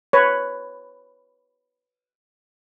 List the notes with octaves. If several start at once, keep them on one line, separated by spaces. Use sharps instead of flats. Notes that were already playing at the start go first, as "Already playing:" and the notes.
B4 C#5